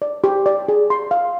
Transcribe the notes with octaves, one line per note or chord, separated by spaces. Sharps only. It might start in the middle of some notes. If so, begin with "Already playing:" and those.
D5
G4
D5
G#4
C6
F5